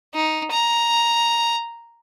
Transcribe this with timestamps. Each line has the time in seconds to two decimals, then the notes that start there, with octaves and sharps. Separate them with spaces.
0.14 D#4
0.51 A#5